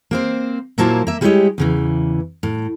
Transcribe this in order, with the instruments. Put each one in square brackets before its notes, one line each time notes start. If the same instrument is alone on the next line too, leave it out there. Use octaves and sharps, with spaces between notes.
[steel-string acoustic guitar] A#3 C4 C5
A#2 F#3 A#3 E4 C5 A5
A#3 E5
G3 G#3 E4 G4 C#5 D#5
E2 C#3 E3
A2